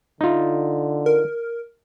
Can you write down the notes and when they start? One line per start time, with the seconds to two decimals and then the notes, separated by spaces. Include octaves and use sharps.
0.21 D3 D#4 F4
1.06 A#4